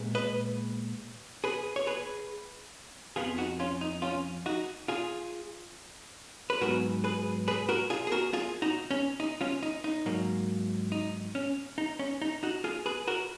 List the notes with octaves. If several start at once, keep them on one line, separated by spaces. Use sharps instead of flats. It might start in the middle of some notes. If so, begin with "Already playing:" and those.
Already playing: A#2 G#3 B3
B4 D#5
G#4 B4
C#5
G#4 B4
F2 F3 B3 F4 G#4
D#4 F#4
C#4 F4
D#4
C#4 F4
D#4 F#4
F4 G#4
B4
G#2 F#3 B3 F#4 A#4
G#4 B4
G#4 B4
F#4 A#4
F4 G#4
G#4
F#4 A#4
F4 G#4
D#4 F#4
C#4
D#4
C#4 F4
D#4
D#4
G#2 F#3 A#3
D#4
C#4
D#4
C#4
D#4
D#4 F#4
F4 G#4
G#4 B4
F#4 A#4